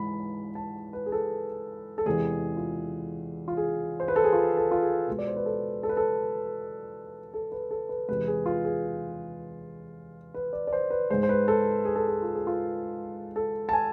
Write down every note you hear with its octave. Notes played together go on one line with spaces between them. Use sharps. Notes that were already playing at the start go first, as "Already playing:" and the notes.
Already playing: G#2 E3 G#3 B5
A5
B4
G#4
A4
A4
E2 C3 E3 G#3 G#4
F4
F4
G#4
C5
B4
A4
G#4
F4
A4
F4
G#4
B2 G#3
D5
C5
B4
A4
A4
B4
A4
A4
B4
A4
B4
E2 C3 G#3 B4
G#4
F4
G#4
B4
D5
D5
C5
B4
G#2 G#3 C5
C5
B4
A4
G#4
A4
G#4
F4
G#4
F4
A4
A5
G#5